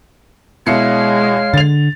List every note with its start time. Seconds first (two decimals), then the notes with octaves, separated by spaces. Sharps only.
0.67 B2 G#3 E4 C#5 F5 F6 C#7
1.54 D3 A6 F7